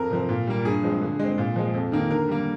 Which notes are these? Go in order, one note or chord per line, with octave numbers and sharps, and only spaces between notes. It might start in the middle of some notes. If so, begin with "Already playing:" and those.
Already playing: F2 A#4
C3 F3 C4
A#2
G3 A#3
G2 G#4
F3 G#3 C4
D3
G#3 C4
A#2
F3 G#3
F2
D#3 A#3
D3 A#4
G3 A#3